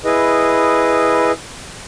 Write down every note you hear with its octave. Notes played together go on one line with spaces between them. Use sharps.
E4 G#4 B4 D#5